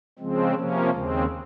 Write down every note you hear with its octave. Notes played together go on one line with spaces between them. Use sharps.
C#3 F3 G#3 C4
C3 F3 A#3 C#4
D#2 C#3 G#3 C4